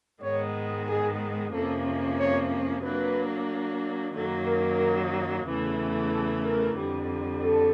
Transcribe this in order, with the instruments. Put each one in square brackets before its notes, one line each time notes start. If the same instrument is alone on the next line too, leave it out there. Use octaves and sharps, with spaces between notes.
[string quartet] G#2 D#3 G#3 B3 [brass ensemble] C#5
[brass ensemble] G#4
[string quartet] F2 C3 F3 A#3 C#4 [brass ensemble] A4
[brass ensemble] C#5
[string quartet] F#3 A#3 D4 [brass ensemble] B4
[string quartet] F#2 D#3 F#3 A#3 [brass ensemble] A4
[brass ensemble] A#4
[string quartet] E2 C#3 E3 A3
[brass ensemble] A4
A#4
[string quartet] F2 D3 G3
[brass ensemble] A4